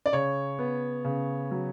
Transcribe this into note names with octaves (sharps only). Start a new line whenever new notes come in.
D5
C#3 C#5
B3
C#3
F#3